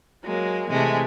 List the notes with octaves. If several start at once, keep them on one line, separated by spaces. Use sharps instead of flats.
F#3 G#3 A#3
C3 E3 G#3 A3